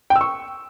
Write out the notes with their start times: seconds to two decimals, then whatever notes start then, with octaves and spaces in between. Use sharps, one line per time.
0.10 G5
0.16 E6
0.21 C#6